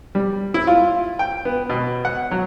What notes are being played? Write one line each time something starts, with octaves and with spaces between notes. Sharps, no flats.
G3
E4
F4
G5
B3
B2
F#5
F#3